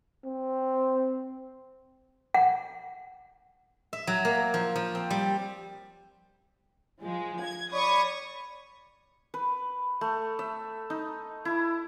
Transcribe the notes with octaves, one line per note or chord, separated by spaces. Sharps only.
C4
F#5
E5
F#3
A#3
F3
F3
C4
G3
F3 G#3
G#6
C#5 D5 B5 C#6 D#6
B4
A3
E5
D#4
E4